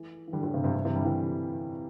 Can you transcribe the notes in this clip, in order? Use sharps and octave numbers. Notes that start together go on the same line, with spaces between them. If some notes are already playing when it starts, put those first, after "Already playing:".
Already playing: E3 A3
E3
D3 G3
A2 D3
G2 C3
G2 C3
G2 C3
C3 E3
D3 G3
C3 E3